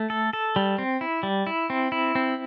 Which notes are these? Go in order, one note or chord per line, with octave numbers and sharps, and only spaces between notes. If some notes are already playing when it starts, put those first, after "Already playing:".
Already playing: A3
A4
A4
G3
C4
E4
G3
E4
C4
E4
C4